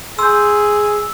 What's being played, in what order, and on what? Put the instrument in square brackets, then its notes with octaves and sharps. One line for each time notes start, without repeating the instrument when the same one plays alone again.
[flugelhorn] G#4 [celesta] C6 G6 [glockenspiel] E6